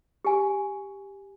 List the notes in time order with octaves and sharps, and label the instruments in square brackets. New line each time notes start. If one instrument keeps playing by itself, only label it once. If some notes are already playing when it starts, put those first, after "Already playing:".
[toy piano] G4 G#5